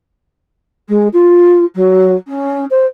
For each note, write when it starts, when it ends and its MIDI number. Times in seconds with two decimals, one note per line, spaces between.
0.89 1.08 56
1.13 1.65 65
1.75 2.15 54
2.27 2.65 61
2.70 2.86 72